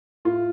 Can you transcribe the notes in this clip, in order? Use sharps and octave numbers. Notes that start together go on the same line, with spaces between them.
A2 F4